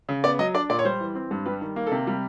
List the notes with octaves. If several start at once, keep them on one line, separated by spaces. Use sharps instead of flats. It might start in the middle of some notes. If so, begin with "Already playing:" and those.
C#3
B3 D5
F#3 D#5
D4 D5
A#2 D5
C#5
G3 C5
E3
C4
G2
G3 B4
D#3
A#3
A4
C3
G3